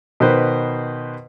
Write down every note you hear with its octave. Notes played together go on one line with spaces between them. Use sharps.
B2 D#3 B4 C5